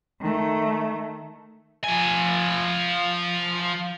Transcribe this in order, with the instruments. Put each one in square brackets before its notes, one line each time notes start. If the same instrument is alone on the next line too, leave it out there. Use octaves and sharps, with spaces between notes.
[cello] D#3 A3
[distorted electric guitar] F3 G#5